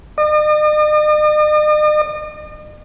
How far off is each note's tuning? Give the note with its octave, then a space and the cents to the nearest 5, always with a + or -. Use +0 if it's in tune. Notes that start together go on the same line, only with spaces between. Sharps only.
D#5 -45